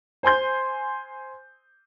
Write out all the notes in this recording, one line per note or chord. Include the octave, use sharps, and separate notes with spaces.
C5 G#5 C6 G6